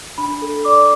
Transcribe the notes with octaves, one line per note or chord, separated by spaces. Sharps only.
D4 B5
A4
D5 D6